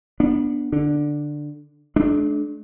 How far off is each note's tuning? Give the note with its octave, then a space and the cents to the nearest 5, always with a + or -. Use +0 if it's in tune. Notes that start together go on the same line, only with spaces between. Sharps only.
B3 -20 D4 -5
D3 +0 D4 +10
A3 -45 D4 +0